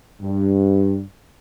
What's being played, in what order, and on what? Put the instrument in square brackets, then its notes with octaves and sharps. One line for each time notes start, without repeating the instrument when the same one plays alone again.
[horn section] G2